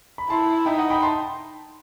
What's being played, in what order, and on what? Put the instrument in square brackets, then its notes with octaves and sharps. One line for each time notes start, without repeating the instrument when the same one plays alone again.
[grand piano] B5
[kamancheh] E4 [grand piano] A5 C6
[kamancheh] D#4 [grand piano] E5 G5
[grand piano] D#5 F#5
G5 B5
A5 C6